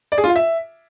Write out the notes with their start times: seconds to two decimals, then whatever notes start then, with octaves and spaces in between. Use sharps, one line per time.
0.12 D5
0.18 G#4
0.24 F4
0.30 F5
0.36 E5